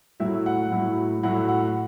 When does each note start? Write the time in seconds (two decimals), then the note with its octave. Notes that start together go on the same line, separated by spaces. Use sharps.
0.20 A2 F#3 A3 E4 E5
0.46 F#5
0.71 A2 F#3 A3 E4
1.23 A2 F#3 A3 E4 F#5
1.49 F#5